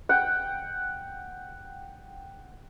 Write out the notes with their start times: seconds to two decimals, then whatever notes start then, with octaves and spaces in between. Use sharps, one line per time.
0.09 F#5 G5